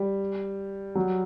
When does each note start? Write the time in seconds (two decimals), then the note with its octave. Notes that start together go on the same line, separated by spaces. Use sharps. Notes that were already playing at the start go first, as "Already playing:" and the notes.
Already playing: G3
0.95 F#3